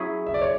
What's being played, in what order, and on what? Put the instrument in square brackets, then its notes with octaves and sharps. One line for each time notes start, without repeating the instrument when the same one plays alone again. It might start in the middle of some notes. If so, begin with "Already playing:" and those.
Already playing: [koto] F#3 C#4 E4 G#4
[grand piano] E5
D5
C#5